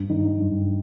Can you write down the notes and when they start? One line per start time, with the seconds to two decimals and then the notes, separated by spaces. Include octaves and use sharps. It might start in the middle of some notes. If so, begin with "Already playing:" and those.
Already playing: G2
0.10 D#3
0.40 G2